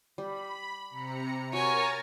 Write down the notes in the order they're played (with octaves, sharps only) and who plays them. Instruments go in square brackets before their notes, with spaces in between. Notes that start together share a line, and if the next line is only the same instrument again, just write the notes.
[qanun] G3 [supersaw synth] B5
[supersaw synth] C3 A#5 C#7
[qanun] F#4 [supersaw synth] A#4 A#5 A6 [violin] C#5 G#5